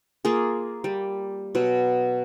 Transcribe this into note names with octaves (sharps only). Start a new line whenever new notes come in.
A#3 F4 G#4
G3
B2 F#3